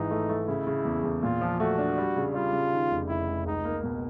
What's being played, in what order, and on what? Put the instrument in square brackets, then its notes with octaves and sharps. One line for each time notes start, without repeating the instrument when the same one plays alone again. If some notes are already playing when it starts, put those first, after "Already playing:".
Already playing: [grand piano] G#1 G#2 E3 [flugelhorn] D#4
[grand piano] A3
A3
[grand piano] C#3 [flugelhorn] E4
[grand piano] C#3
E2
E2
[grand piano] A#2 [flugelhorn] F4
[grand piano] F3
[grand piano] A3 [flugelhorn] F#4
[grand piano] D4
G3
C#3
[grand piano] G3 [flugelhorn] F4
[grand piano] C#3
D#3
F1
[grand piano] F1 [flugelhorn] E4
[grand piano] F1
[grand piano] C#2 [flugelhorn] D#4
[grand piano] A#3
B2